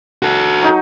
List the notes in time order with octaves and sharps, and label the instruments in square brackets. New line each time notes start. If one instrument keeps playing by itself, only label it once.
[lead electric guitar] F#4 A4
[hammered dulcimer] F#3 D#4